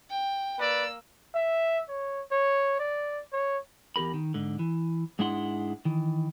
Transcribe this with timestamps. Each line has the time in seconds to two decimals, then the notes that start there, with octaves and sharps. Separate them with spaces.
0.11 G5
0.59 A#3 B4 D5 E6
1.35 E5
1.88 C#5
2.31 C#5
2.79 D5
3.33 C#5
3.96 E2 G4 A#4 B5
4.14 D#3
4.34 G#2 D3
4.59 E3
5.19 G#2 G#3 D4 E4 F#5 C6
5.85 D#3 E3